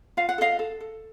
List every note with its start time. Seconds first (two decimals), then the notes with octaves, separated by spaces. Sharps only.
0.17 F4 F5
0.29 F#5
0.38 A4 D#5 F5
0.59 A4
0.80 A4